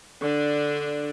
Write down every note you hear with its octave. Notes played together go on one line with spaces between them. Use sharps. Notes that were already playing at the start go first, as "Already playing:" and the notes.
D3 D4